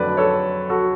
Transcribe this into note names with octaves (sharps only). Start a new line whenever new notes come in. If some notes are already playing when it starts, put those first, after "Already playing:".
Already playing: F2 D3 F#3 A3 B4 D5
A4 C#5
F#4 A4